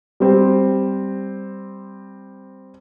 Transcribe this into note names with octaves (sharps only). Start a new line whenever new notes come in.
G3 C4